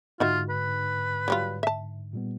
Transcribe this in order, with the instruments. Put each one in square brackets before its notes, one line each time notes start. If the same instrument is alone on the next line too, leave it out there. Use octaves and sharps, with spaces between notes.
[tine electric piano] G#2 D3 [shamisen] D#4 F#4 E5 [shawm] F4
[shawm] B4
[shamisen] F#3 G3 F4
E5 A5
[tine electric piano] A#2 G3 B3